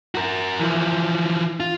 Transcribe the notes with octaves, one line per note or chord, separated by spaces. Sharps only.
F#4 A#4
E3 F3
F4